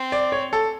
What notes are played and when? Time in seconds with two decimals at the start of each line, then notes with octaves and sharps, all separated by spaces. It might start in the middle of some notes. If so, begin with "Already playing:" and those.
Already playing: C4
0.12 D5
0.32 C#5
0.53 A4